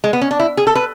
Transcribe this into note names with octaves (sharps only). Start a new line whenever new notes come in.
G#3
B3
C#4
D4
E4
G#4
A4
B4